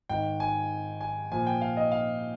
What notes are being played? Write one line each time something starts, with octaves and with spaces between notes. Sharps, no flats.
G#2 D#3 G5
G#5
G#5
A#2 F3 G#5
G5
F5
D#5
F5